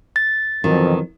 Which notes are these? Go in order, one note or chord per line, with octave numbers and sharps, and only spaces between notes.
A6
F2 B2 D#3 E3 F#3